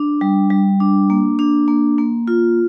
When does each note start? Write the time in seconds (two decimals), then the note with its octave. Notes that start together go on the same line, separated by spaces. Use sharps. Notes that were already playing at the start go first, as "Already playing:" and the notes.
Already playing: D4
0.21 G3
0.50 G3
0.80 D4
1.10 A#3
1.39 D4
1.68 A#3
1.98 A#3
2.28 F4